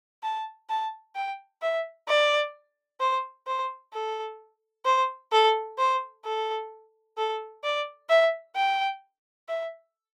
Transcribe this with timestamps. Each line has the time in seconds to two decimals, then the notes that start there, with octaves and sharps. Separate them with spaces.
0.23 A5
0.69 A5
1.15 G5
1.62 E5
2.08 D5
3.00 C5
3.47 C5
3.93 A4
4.85 C5
5.32 A4
5.78 C5
6.25 A4
7.17 A4
7.64 D5
8.09 E5
8.56 G5
9.49 E5